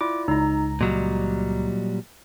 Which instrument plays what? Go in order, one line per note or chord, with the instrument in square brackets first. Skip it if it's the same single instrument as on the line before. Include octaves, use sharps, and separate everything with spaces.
[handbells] E4 F4 D5 [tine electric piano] D6
[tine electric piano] C#2 A#5 [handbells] D#4
[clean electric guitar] A#2 F#3 G3 [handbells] D#5